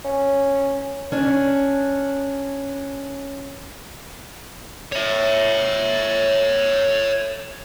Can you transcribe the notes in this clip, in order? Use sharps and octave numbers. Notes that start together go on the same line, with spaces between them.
C#4
C#4 D4
C#5 E5